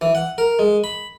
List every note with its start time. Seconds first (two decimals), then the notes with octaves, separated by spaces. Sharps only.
0.01 E3
0.15 F#5
0.38 A#4
0.59 G#3
0.84 B5